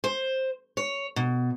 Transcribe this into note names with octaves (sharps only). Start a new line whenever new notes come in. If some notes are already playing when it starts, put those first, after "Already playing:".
C5
C#5
B2